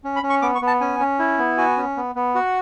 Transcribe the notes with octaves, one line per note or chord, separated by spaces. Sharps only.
C#4
B5
C#4
C#6
B3 D6
C#6
B3
A5
C#4 G#5
C#4
E4
B3
F#4 G#5
C#4
B3
B3
F#4 F#5